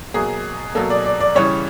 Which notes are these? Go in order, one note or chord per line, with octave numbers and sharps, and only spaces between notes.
B2 F#3 A#3 G#4
B2 F#3 A#3 A4
D5
D5
D5
C#3 E3 G3 C#5